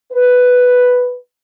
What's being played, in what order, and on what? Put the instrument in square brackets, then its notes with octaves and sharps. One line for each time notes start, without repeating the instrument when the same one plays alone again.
[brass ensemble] B4